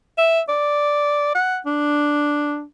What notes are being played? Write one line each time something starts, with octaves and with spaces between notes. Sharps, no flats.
E5
D5
F#5
D4